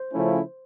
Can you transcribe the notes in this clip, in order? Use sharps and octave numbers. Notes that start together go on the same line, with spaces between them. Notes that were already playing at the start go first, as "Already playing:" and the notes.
Already playing: C5
C#3 F3 A3 C#4 E4